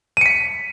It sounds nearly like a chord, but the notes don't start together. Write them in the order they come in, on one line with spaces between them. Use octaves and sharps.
D#7 C#7 B6